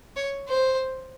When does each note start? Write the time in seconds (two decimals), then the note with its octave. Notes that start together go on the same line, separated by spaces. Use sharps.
0.16 C#5
0.48 C5